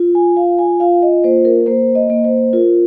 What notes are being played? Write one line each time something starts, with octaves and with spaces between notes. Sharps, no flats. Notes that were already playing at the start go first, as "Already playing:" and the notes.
Already playing: F4
G#5
F4 F5
G#5
F4 F5
D#5
A#3 C5
A#4
A#3 C5
D#5
A#3
C5
F4 A#4